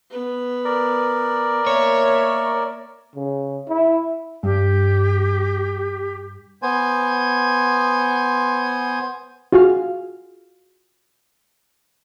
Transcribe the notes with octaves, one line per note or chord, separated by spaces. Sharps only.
B3 B4
A#4 D5
A#3 C#5 E5
C#3
E4
G2 G4
B3 C5 G#5
F4 F#4 G#4 F5